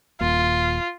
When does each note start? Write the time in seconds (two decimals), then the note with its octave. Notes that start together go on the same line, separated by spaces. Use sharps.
0.21 D#1 A#2 F4